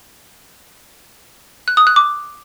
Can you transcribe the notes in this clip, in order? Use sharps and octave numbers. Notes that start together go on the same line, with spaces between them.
F#6
D#6
F#6
D6